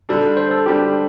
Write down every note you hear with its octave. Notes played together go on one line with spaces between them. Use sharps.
D3 G3 D4 A4
C5
A4
D3 G3 D4 G4